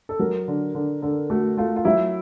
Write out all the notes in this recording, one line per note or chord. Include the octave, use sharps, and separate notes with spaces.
A4
F#3 A#4
D3
D3
D3 A4
A3 F#4
A3 F4
F4
F#3 E4